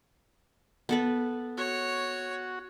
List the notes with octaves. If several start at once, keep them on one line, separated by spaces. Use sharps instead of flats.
B3 A4 B4
F#4 C#5